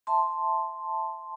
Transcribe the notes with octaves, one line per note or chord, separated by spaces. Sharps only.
E5 A5 C6